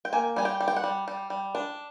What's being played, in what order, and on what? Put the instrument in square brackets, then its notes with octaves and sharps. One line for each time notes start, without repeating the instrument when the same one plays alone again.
[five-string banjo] G5
A#3 G#5
G3 G#5
G5
G3
G5
F#5
G3
G3
G3
D4